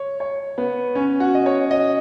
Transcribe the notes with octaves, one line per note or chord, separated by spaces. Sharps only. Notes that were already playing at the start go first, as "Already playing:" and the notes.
Already playing: C#5
C#5
B3
C#4
F#4
D#5
C#5
D#5